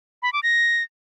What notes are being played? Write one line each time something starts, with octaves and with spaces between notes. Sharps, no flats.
B5
D6
A#6